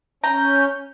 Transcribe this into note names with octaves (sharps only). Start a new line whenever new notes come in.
C#4 A#5 G6